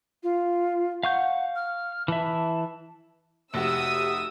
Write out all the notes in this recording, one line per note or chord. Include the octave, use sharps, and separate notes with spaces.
F4
F5 F#5 C#6 G6
F6
E3 E5 A5
F1 F#4 G4 E5 D#6 E6 E7